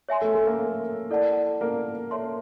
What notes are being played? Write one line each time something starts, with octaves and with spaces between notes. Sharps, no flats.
C#5 E5 G#5 C6
A3 A4
A3 A4
A#3 A#4
E4 A4 D5 F#5 A5
A#3 A#4
A4 C#5 E5 A5 C6